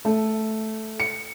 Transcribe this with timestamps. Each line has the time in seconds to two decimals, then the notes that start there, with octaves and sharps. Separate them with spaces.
0.05 A3
1.00 C#7